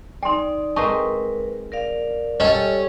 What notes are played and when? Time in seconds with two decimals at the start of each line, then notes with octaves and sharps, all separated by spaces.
0.23 D#4 D5 G5 C6
0.76 G#3 C4 D#4 A#4 B4 A5 C#6
1.72 A#4 D5 F5
2.40 G3 C#4 A4 D#5